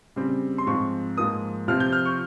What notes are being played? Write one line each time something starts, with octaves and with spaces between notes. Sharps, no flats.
C#3 G3 C4
C6
G#2 F3 C4 C#6
G#2 F3 A#3 D#6
C3 F3 C4 F6
G6
F6
C#6